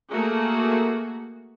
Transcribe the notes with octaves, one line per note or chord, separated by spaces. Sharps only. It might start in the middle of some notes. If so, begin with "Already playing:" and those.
A3 A#3 F#4 G#4